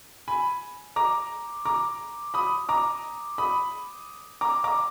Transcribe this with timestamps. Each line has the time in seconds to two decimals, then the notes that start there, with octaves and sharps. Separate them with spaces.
0.28 G#5 B5
0.96 A#5 D6
1.65 A#5 D6
2.34 B5 D#6
2.69 A#5 D6
3.38 B5 D#6
4.41 A#5 D6
4.64 A#5 D6